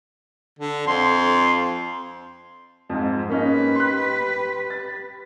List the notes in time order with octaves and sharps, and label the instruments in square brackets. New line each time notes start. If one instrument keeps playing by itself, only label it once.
[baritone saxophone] D3
[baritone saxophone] F2 [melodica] C6
[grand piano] F2 G#2
[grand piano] A#3 C#4 D#4 [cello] G4 B4
[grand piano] C6 F#6
A6